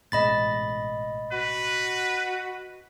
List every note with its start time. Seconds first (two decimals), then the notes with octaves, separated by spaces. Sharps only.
0.12 A1 G#2 B2 D#5 B5 A6
1.33 F#4 B4